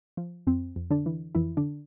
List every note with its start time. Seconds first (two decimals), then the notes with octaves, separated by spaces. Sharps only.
0.17 F3
0.47 F2 C4
0.76 F2
0.90 D3 D4
1.06 E3
1.35 F2 E3 E4
1.57 D3 D4